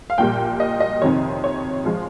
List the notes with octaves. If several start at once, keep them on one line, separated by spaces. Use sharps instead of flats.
F5
A#1 A#2 G3 G5
D#5
D#5
F2 C3 D#3 C#5
C#5
F3 G#3